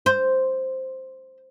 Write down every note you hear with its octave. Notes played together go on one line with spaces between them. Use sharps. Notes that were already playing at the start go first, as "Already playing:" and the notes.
C5